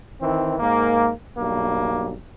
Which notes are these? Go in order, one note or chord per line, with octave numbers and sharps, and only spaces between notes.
D#3 E3 C4
G#2 A#3
B1 G2 A#3